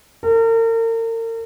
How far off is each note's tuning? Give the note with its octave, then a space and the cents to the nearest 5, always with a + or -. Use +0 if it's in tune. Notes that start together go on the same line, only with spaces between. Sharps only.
A#4 -40